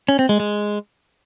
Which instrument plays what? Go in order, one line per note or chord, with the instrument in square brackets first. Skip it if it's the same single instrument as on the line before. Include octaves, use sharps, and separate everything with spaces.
[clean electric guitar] C#4
C4
G#3
G#3